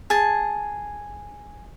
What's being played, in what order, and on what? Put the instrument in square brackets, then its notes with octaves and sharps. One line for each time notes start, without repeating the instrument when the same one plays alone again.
[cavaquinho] G#4 A5